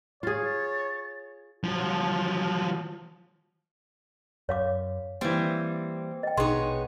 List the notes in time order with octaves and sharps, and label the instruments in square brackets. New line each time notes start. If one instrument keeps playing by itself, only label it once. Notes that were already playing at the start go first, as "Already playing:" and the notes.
[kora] F4 G#4 [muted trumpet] C#5 [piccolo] A6
[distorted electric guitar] F3 F#3
[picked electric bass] F#2 [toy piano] C#5 F5 D6
[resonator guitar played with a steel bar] E3 G3 [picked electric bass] A#3 [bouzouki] C4
[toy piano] D#5 G5
[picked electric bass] A#1 B2 [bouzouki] G#3 C#5 [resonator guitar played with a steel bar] B3 D#4 [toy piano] C6